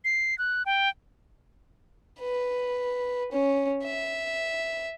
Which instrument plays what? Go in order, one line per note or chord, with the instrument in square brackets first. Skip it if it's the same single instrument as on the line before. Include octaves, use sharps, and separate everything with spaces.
[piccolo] C7
F#6
G5
[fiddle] B4
C#4
E5